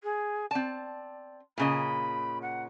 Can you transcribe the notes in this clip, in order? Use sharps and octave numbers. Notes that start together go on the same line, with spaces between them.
G#4
C4 D5 A5
A#2 C#3 D#5 B5
F#5